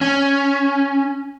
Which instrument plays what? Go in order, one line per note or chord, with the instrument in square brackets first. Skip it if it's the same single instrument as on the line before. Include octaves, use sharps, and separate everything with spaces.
[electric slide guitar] C#4